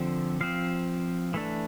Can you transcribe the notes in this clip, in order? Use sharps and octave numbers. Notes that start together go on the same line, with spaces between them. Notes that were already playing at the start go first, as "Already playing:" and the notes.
Already playing: D3 F3 C4 E5
F3 C4 F5
E3 A3 D4